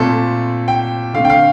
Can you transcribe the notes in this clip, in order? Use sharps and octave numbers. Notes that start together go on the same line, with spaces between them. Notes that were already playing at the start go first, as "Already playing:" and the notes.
Already playing: A#2 A3 C4 A4
G5
D3 A3 C4 F5
G5
F5